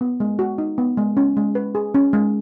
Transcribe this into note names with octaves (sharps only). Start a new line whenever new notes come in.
B3
G#3
F#4
D#4
B3
G#3
C#4
G#3
B4
G#4
C#4
G#3